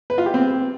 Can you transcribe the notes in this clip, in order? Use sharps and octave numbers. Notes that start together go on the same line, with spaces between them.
B4
F4
G4
C4